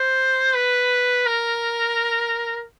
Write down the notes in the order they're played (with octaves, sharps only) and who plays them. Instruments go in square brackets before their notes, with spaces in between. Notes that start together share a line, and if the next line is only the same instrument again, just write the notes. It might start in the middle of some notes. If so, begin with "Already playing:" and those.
Already playing: [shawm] C5
B4
A#4